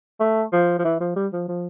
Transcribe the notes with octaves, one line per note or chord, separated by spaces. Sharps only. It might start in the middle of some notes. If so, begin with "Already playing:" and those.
A3
F3
F3
E3
F3
G3
F3
F3